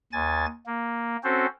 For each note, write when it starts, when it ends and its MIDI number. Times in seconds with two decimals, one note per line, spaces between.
0.13 0.46 39
0.13 0.46 80
0.13 0.46 93
0.66 1.16 58
1.24 1.46 60
1.24 1.46 61
1.24 1.46 66
1.24 1.46 69
1.24 1.46 72